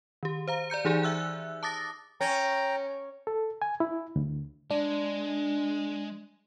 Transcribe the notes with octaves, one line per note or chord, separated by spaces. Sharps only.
D#3 G4
C5 F5 A#5
D5 A#5 G6 C#7
E3 D#4 G4 G#4 D5 G#5
E5 E6 F#6
A5 D6 D#6 A6 A#6
C#4 G5 A#5
A4
G#5
E4
D2
G#3 D4